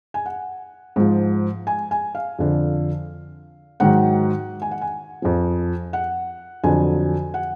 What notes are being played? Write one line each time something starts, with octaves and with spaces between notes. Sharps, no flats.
G#5
F#5
G#2 F3
G#5
G#5
F5
F2 D3 F3
G#2 D#3 F#3 F#5
G#5
F#5
G#5
F2 F3
F#5
F2 D3 F#3 G#5
F#5